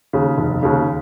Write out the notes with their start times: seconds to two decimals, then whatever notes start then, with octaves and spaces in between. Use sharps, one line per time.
0.13 D#2 C#3
0.38 F1
0.63 D#2 C#3